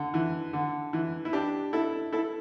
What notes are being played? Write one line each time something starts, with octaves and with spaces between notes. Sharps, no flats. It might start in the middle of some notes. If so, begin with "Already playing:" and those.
Already playing: D3
E3
D3
E3
E4
D4 G4
E4 A4
E4 A4